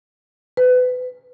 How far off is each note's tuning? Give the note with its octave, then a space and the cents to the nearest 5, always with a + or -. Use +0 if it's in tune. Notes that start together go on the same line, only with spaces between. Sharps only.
B4 +25